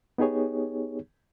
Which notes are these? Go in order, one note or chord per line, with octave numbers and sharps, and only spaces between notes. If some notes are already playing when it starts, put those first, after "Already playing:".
B3 D#4 G4 G#4 C#5